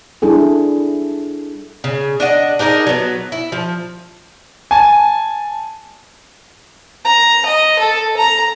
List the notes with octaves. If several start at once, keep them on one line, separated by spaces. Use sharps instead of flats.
G3 D4 E4 G#4 A4
C#3
D4 D#5 F#5
D4 D#4 G#4 A#4
F#3 B3
E4
F3
G#5 A5
A#5
D#5
A4
A#5